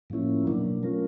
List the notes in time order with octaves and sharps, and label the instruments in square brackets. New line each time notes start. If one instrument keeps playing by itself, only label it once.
[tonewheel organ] A2 F3 A#3 C#4 E4
B2 F#3 A#3 D4
F#3 A3 C#4 F4 A#4